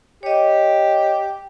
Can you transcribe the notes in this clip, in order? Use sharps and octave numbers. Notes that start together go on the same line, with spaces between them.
G4 C#5 D#5